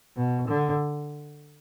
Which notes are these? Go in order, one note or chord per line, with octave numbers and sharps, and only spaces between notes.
B2
D3